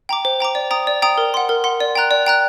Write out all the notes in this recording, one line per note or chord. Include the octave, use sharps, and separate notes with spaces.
G5 A#5 D6
C5
G5 A#5 D6
D5
G5 A#5 D#6
D5
G5 A#5 D#6
A#4
F#5 C6
A#4
F#5 C6
D5
G5 A#5 F#6
D5
G5 A#5 F#6